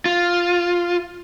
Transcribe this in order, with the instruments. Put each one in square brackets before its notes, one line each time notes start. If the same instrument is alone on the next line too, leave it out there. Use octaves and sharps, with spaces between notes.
[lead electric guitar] F4